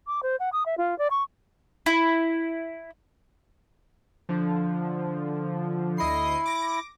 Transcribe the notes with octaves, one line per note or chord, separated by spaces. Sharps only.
D6
C5
F#5
D#6
E5
F4
D5
C#6
E4
D3 F3
D2 E4 D#5 C7
D6 A#6